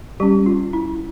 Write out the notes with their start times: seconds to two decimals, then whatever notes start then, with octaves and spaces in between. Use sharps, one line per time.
0.20 G3 C#4 G4
0.46 F4
0.73 E4